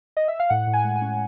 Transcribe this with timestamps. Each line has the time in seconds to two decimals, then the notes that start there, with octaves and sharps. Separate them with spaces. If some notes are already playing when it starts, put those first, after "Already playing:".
0.17 D#5
0.28 E5
0.40 F5
0.50 A2 F#5
0.67 A2
0.73 G#5
0.84 G#3
0.96 G#5
1.02 C#4